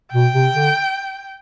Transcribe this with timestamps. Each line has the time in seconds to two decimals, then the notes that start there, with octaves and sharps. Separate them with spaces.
0.13 B2 G5
0.33 C3
0.54 D3